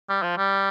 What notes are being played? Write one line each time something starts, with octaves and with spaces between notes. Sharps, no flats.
G3
F3
G3